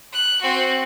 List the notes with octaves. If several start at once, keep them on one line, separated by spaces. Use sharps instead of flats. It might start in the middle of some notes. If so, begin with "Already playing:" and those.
F#6
C4 F#4